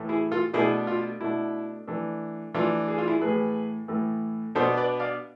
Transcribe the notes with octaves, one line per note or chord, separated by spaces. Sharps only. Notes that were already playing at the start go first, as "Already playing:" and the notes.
Already playing: A2 E3 A3
E4 G#4
F4 A4
B2 A3 D4 E4 G#4
F4
B2 A3 D4 E4
E3 A3 D4
E3 A3 D4 F4
G#4
F4
E4 G#4
A2 E3 A3 G#4 B4
A2 E3 A3
B2 B3 D4 A4 C5
B4 D5
D5 F5